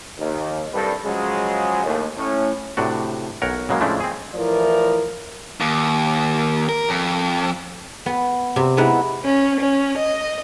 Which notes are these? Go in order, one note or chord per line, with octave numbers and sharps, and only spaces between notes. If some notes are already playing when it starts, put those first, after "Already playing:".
D#2
C2 G2 G3 G4 A4 B4
C#3 F3 F#3 G#3
D#2 A2
A2 C#4
A2 C3 D4 F#4
B1 A#4 C#5 F#5 A#5
C#3 F#3 G#3 A#3
A2 C#3 F3 G#3 A3 D4
C4 G#4
A2 E3 F3 A#4 D5
D#2
A#4
F2
B3
C3
G#3 B3 D#4 E4 F#5
C#4
C#4
D#5